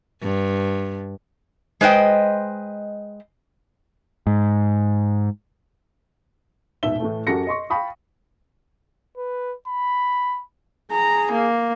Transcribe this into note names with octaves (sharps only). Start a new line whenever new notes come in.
G2
G#3 B4 C5 D#5 G5
G#2
D#1 G#2 B2 E5 G7
A2 E3 A3
F#2 F#4 G4 A4 A#6 C#7
D#5 C6 C#6
F5 G5 A5 B5 C#6 D#6
B4
B5
G#4 A#5
A#3